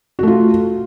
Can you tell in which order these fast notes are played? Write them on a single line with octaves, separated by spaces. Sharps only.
F#4 A3 F4